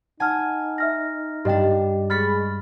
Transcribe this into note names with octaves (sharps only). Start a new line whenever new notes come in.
D#4 F#5 G#5 A5 F6
E5 F6 A#6
G2 D4 G4 D#5 G5
G#3 B5 C#6 F6 A6 B6